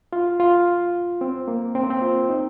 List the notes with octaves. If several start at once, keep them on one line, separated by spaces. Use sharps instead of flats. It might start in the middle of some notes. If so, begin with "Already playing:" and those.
F4
F4
C4
A#3
C4
A#3
C4
F4
D#4